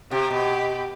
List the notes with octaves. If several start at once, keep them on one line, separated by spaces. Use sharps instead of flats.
C3 G4
B2